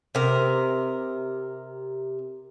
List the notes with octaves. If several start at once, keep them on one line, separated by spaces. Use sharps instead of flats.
C3 A#4